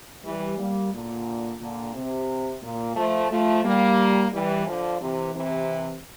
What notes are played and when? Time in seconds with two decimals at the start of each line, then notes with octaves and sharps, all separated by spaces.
0.24 E3 G3
0.58 G3 A#3
0.92 A#2 D3
1.60 A#2 D3
1.94 C3
2.62 A#2
2.96 F3 A3
3.30 F3 A3
3.64 G3 A#3
4.32 E3 G3
4.66 D3 F3
5.00 C3 E3
5.34 C3 E3